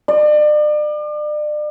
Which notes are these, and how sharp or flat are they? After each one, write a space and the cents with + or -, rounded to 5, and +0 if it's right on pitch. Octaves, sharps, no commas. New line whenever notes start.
D5 +35